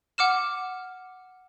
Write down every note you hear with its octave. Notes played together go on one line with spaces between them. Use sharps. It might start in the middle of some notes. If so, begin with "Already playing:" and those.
F#5 D6 F6 E7